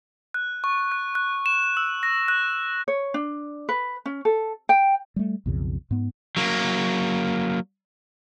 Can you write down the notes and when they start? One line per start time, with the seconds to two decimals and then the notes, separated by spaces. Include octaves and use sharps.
0.34 F#6
0.64 C#6
0.92 F#6
1.15 F#6
1.46 E7
1.77 E6
2.03 A#6
2.28 F#6
2.88 C#5
3.14 D4
3.69 B4
4.06 C#4
4.25 A4
4.69 G5
5.16 G3 A3
5.46 B1 F2 C#3
5.91 G#2 B3
6.37 F#3 A#3